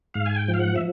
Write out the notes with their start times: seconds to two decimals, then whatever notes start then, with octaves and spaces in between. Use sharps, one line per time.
0.14 G#2 F5
0.26 G#5
0.36 G5
0.48 F3
0.54 F5
0.60 F#5
0.76 E5